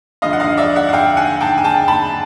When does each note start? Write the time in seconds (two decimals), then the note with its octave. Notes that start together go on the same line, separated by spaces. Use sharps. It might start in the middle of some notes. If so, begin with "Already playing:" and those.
0.22 E1 D2 D3 F3 D#5 F5
0.33 F#5
0.40 D#5 F5
0.57 D5 E5
0.76 E5 F#5
0.89 F#5
0.93 F5 G5
1.17 F#5 G#5
1.41 G5 A5
1.58 G#5
1.64 G5 A5
1.88 A5 B5